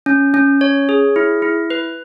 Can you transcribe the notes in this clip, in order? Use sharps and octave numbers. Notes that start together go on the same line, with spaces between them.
C#4
C#4
C#5
G#4
E4
E4
B4